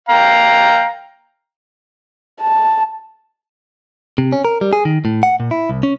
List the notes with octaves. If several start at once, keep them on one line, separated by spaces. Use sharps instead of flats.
F5 G5 A#5
A5
C3
C#4
A#4
G3
G#4
D#3
A2
F#5
A#2
E4
C2
C#4